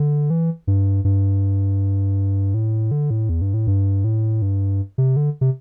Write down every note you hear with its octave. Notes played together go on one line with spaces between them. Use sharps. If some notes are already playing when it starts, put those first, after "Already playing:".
Already playing: D3
E3
G2
G2
A2
D3
A2
E2
G2
A2
G2
A2
G2
C3
D3
C3